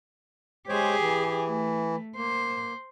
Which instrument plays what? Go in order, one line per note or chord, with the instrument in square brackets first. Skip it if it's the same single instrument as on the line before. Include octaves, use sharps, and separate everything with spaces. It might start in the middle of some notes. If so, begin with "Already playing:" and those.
[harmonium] G#3 C5 C#5 [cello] G4 G#4
[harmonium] E3
[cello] A3
[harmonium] A#3 [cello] C5